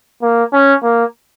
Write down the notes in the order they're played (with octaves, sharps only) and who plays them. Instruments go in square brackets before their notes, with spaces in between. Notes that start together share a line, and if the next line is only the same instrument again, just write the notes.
[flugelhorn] A#3
C#4
A#3